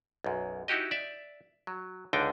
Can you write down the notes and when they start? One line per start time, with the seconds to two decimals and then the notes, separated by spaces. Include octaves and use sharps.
0.24 B1 F#2
0.68 D#4 E4 F#4 G4 D#5
0.91 D5 E5
1.67 F#3
2.13 C#2 D3 D4 D#4 G5